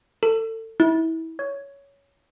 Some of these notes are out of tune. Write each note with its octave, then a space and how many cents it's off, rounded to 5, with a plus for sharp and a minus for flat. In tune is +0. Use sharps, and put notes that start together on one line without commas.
A4 +30
E4 -25
C#5 +10